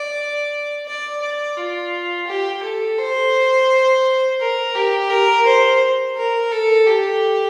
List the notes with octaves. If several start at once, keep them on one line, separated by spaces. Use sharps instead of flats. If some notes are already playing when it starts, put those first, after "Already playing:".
Already playing: D5
D5
D5
F4
G4
A4
C5
A#4
G4
A#4
C5
A#4
A4
G4